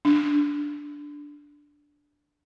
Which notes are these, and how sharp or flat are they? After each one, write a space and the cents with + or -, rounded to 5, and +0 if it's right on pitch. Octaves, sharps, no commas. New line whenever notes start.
D4 -5